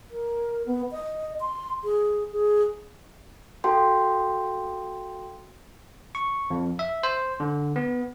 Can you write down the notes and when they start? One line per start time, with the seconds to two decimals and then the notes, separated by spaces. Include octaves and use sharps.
0.11 A#4
0.66 B3
0.92 D#5
1.40 C6
1.84 G#4
2.32 G#4
3.64 F#4 A4 F5 G5 C6
6.15 C#6
6.50 F2
6.79 E5
7.03 C5
7.40 D3
7.76 B3